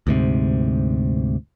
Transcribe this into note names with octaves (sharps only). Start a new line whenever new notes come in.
D2 G#2 C3